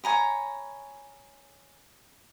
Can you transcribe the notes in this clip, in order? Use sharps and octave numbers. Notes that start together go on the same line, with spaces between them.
C#5 G#5 A#5 B5